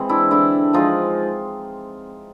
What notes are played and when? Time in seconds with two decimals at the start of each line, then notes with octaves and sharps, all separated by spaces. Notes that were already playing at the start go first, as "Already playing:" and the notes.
Already playing: E3 G#3 C4
0.09 D4 E4
0.31 D3 D4 E4
0.73 F3 G#3 D#4 F4